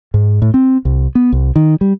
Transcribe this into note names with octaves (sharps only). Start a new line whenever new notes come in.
G#2
A2
C4
C2
B3
C2
D#3
G3